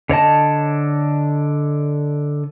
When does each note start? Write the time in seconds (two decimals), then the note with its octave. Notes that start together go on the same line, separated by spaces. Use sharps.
0.09 D3 C#5 D#5 A5